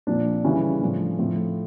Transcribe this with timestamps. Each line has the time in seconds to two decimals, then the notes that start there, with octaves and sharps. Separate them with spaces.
0.07 A#2 F3 D4
0.44 C#3 E3 G3 C#4
0.81 A2 F3 D4
1.19 A2 F3